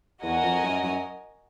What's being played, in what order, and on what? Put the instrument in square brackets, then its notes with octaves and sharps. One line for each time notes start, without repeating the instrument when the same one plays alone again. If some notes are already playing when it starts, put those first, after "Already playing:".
[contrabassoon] E2 [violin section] F#4 A#4 D#5 G#5
[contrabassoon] F2
F#2
F#2